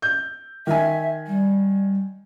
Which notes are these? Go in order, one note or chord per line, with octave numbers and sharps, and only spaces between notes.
G6
D#3 E5 G#5
G3